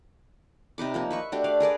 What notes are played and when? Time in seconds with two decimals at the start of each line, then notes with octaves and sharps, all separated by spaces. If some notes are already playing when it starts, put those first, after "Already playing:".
0.78 C3 D#4 B4 D6
0.94 F3 A#3 D#4
1.10 B4 E5 C#6
1.32 A3 D4 F#4 G4
1.44 D5 F5
1.60 G#4 A#4 B4 D5